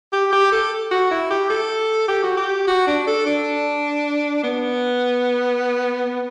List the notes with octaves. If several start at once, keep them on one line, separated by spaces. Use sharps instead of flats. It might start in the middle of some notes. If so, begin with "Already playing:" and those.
G4
G4
A4
F#4
E4
G4
A4
G4
F#4
G4
F#4
D4
A4
D4
B3